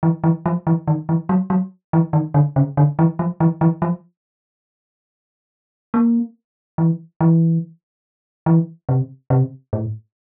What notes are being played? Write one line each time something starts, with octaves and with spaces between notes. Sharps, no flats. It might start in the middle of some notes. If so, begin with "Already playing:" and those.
E3
E3
F3
E3
D#3
E3
F#3
F#3
E3
D#3
D3
C#3
D3
E3
F3
E3
E3
F3
A#3
E3
E3
E3
C3
C3
A2